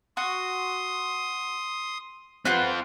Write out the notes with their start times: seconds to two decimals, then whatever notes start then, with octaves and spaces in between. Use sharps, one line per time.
0.17 F#4 C6 D#6
2.45 C4 F4 B4 C5 F#5